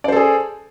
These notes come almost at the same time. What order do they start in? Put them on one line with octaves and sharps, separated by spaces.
D5 C5 A4 G#4